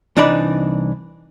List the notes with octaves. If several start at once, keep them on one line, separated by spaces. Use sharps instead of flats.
C2 E3 D4 D#4 D5 B5